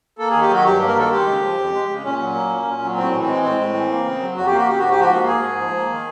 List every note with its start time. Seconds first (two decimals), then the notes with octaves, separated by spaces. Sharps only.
0.18 A#3 A4
0.30 D#3 G#4
0.42 G4
0.49 F#3 F#4
0.65 G2 G4
0.81 A#3
0.88 A#4
0.95 D#3 A4
1.11 G#3 G4
1.27 C#3
1.42 F3
1.57 F2
1.73 G#3
1.89 C#3
2.04 A#2 C#4
2.19 F#3
2.35 A#3
2.50 A#2
2.65 A#2
2.81 F#3
2.96 A2 C4
3.12 E3
3.20 C4
3.27 G#3
3.42 A2 C4
3.58 A2
3.73 E3
3.88 A#3
4.05 C#3
4.20 F#3
4.35 F2 F#4
4.46 G4
4.51 A#3
4.56 F#4
4.66 C#3 G4
4.79 G#2 F#4
4.90 G4
4.97 F3 F#4
5.13 A#3
5.27 G#2 G#4
5.42 G#2
5.58 F3
5.74 A#3
5.89 D#3